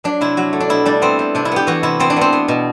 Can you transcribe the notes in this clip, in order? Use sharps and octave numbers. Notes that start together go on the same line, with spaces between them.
F#3 D4
C3 E4
F#3 F#4
A3
D4
B2 E4
G3 D4
B3 C4
G3
C3 D4
E4
B3 G4
E3 F#4
C3 E4
B3 C4
D4
B3 C4
B3
B2